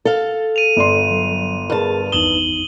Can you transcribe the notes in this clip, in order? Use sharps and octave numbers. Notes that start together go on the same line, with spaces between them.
A4 F5
D#7 F7
G1 D5 C6
F#3
G2 G#4 A#4 A5
G#1 E2 D#4 D#6 E7 F#7 G7